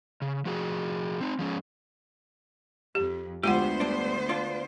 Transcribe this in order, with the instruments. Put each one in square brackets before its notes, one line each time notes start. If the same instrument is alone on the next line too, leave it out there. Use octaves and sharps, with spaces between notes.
[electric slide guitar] C#3
F3 F#4 G#4
C4 D#4
F3 G#3 C#4
[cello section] F2 [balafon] G4
[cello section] D2 B3 C5 [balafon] G#3 F4 F#5 [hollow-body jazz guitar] G4
[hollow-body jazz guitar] G2 D4
D4 F4